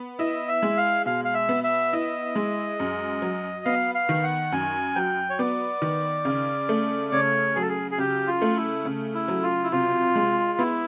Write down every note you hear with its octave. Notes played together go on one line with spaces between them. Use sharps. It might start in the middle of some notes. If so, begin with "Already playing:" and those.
Already playing: B3
E4 D#5
E5
G#3
F5
B2 F5
F5
E5
B3
E5
E4 D#5
G#3
F#2
F#3
B3 F5
F5
D#3
F#5
F#2 G#5
F#3 G5
C#5
B3 D5
D#3
C#3
A3
C#3 C#5
F#3 G#4
A4
G#4
G#4
C#3 G4
F4
A3
E4
C#3
E4
F#3
F4
E4
C3 F4
G#3
B3 E4